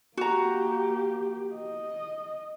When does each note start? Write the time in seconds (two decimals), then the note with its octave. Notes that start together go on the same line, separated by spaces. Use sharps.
0.17 A#3 F#4 G4 A#5
1.55 D#5